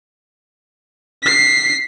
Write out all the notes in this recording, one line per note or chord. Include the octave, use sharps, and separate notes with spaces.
B6 C7